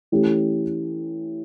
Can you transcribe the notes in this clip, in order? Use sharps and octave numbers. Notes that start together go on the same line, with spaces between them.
E3 A3 C#4 G4